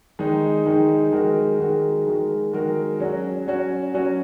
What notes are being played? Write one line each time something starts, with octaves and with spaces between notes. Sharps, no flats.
D#3 G#3 D#4
D#3 G#3 D#4
D#3 G#3 F#4 A#4
D#3 G#3 F#4 A#4
D#3 G#3 F#4 A#4
D#3 G#3 F#4 A#4
F#3 C#4 F#4
F#3 C#4 F#4
F#3 C#4 F#4